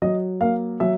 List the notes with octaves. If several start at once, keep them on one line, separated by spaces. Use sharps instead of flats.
F#3 D#5
A#3 F5
F#3 E5